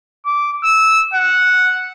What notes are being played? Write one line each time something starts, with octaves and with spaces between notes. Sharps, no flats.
D6
E6
F#5